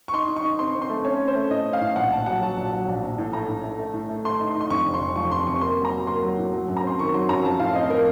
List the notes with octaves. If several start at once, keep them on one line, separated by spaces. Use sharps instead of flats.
C#6
D#4 C6
D#4
C#6
D#4
C4 C6
C4
C6
A3
C#4 C#5
C#4
C5
A3
A2 D#5
C#4
F5
A2
A#1 F#5
A#1 A5
F#3 F#5
F#3 A5
A#1
F#3
A#1
A#1
A2
A3 A#5
A2
A3
A3
A2
A3
A3 C6
D#4
C6
D#4
C6
F2 C#6
F1
C6
F1
F3 C#6
F2 C6
C3 C#6
A#3 C6
F#3
A#5
F#3
A#3 C6
F#3
A2
F#3
F#2
A#5
C4 C6
D#3 C#6
F#3 C6
F#2 A#5
F3 A5
A2 F5
C4 D#5
F3 A#4